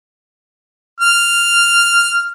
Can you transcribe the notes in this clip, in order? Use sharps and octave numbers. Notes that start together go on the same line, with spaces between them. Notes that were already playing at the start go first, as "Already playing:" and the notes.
F6